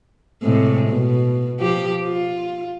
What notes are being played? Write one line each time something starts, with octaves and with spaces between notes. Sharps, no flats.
A2 C3 G#3
B2
F3 G4
F4